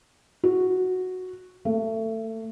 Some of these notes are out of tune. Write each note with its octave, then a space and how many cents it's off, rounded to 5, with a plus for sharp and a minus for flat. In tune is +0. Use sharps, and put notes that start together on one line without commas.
F#4 -5
A3 +25